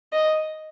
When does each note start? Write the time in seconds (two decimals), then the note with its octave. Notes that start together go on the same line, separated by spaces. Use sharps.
0.13 D#5